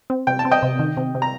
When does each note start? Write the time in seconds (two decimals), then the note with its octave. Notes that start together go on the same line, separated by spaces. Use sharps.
0.10 C4
0.27 C3 G5
0.39 A5
0.45 C4
0.51 D#5 G5
0.63 C3
0.79 D#3
0.97 C3
1.15 C3
1.22 A#5